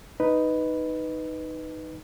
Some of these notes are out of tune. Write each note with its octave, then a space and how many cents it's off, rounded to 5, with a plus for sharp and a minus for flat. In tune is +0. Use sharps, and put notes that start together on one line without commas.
D#4 +0 B4 +0